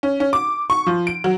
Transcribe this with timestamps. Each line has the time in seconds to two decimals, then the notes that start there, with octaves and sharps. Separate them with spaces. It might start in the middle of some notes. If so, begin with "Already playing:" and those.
0.03 C#4
0.20 C#4
0.33 D6
0.70 C#6
0.87 F3
1.07 D7
1.24 F#3